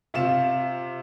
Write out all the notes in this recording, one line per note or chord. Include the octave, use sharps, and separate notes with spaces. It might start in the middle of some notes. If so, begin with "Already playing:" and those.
C3 F4 E7